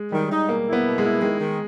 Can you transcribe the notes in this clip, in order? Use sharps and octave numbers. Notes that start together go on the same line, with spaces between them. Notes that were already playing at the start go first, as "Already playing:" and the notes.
Already playing: G#3
D#3 G3
D#4
B2 A#3
E4
B3
B2
G#3
E4
D#3 G#3
D#3